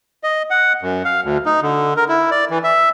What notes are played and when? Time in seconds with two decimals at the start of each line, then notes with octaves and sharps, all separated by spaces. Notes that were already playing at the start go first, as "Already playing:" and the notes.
0.23 D#5
0.50 F#5
0.82 F#2
1.05 F5
1.24 D2
1.46 D#4
1.63 D3
1.97 A#4
2.09 E4
2.31 D5
2.50 E3
2.64 E5